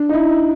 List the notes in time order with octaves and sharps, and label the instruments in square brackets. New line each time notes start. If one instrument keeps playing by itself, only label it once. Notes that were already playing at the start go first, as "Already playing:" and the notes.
Already playing: [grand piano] D4
D#4
E4